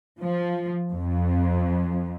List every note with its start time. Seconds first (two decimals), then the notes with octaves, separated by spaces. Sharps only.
0.21 F3
0.92 F2